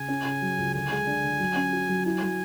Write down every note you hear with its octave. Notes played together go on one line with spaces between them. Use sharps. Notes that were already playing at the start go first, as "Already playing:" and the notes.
Already playing: C#3 G#5
C#4
C#3
F#3
C#2
D3 G#5
G#3
D4
D3
F#3
C#4
F#4
F#3
E4 G#5
F#3